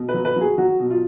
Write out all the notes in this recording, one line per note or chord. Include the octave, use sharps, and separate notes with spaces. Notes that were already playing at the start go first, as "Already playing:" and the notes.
Already playing: B2
B4
F#3
B4
F#3 G#4
F#3 F#4
B2
F4